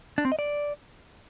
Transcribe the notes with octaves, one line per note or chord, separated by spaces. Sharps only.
D4
C4
D#5
D5